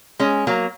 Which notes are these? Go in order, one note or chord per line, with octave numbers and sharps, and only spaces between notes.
G#3 C#4
F#3 A#3